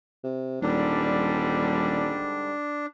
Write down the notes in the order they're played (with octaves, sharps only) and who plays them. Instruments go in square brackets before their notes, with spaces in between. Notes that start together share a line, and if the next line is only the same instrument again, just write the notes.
[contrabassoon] C3
[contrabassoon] D#1 [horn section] G#2 D3 G3 [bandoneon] D4